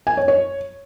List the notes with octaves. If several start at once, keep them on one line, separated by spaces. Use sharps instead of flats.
G#5
C#5
C#5